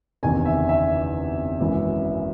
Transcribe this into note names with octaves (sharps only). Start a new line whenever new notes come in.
F#1 E2 C3 D#3 G#5
E5
E5
G#1 F#2 E3